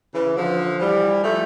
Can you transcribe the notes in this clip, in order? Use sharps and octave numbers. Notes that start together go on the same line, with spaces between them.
C#3 E3
D3 F3
E3 G3
F3 A3